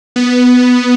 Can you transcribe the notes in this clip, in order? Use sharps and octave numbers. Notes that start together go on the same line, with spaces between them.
B3